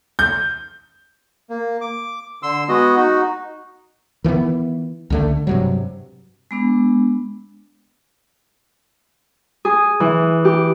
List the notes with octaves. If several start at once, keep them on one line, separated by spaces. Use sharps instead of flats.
G6
A#3
D6
D3 C6 E6
G#3 B3 F#4 D#5
D#4 F#4
D#3 E3 G#3 B3
C#2 D3 A3
G2 C3 F#3
G#3 B3 D4
G#4
E3
G4